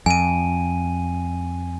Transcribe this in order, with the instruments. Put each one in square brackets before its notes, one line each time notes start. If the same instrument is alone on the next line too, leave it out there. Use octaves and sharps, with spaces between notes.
[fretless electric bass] F2 [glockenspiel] G#5 D#7